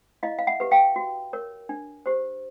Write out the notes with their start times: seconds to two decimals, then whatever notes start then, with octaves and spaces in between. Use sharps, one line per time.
0.23 E4 D#5 F5
0.38 F5
0.47 E5 F#5
0.60 G4 B4
0.71 F5 G5
0.96 F#4
1.33 A#4 C#5
1.69 D4
2.06 G4 C5